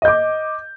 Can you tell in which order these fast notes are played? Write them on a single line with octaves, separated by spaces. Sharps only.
D#5 G6 D6